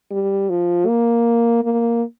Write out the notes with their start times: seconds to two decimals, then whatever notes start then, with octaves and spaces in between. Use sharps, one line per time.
0.11 G3
0.50 F3
0.87 A#3
1.63 A#3